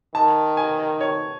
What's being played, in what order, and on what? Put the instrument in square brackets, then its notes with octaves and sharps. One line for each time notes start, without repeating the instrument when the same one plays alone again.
[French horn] D#3 [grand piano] A5
[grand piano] G#5
C#5